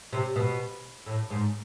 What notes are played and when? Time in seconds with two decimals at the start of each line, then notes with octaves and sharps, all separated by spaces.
0.13 C3
0.36 B2
1.06 A2
1.30 G#2